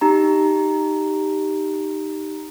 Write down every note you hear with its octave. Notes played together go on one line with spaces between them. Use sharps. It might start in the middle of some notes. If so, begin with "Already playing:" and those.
D#4 G4 A#5